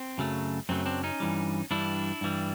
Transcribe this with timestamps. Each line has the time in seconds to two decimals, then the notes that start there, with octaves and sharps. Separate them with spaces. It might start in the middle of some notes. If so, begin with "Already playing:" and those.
Already playing: C4
0.18 F#2 C#3 F#3 A3
0.69 F#2 C#3 F#3 A3 C4
0.86 C4 D4
1.03 C#4 D#4
1.20 G2 E3 G3
1.71 G2 E3 G3 D4 E4
2.21 G2 E3 G3